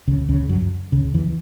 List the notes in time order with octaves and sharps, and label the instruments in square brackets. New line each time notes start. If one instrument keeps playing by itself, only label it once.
[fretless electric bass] C#2 C#3
C#2 C#3
F#2 F#3
C#2 C#3
E2 E3